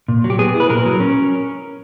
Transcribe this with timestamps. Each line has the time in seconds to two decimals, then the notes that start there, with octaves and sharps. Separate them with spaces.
0.08 A#2
0.24 F#3
0.30 G4
0.39 B3 G#4
0.55 E4
0.60 B4
0.70 A#2 A#4
0.85 F#3
1.00 C#4